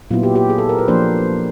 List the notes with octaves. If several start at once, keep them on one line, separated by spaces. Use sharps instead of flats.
A#2 F#3 B3 E4 F4
G4
G4
G#4
A4
A#4
B4
F3 A#3 D4 C5